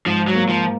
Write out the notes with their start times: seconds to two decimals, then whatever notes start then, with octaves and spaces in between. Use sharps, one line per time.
0.06 G#2 F3
0.28 F#3
0.35 A#3
0.49 F3